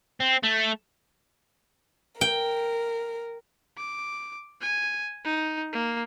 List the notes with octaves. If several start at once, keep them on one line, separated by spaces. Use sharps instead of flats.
C4
A3
A#4 G5
D6
G#5
D#4
A#3